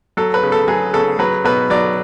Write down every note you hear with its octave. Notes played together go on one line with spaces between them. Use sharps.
F#3 A4
B4
C#3
A4
F#3 G#4
C#3 A4
F#3 B4
B2 B4
F#3 D5